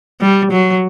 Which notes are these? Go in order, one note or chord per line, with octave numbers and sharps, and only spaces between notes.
G3
F#3